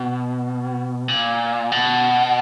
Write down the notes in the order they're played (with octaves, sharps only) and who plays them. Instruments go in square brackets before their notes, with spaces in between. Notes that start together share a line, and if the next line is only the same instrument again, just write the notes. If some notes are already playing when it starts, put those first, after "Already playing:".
Already playing: [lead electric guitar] B2
A#2
B2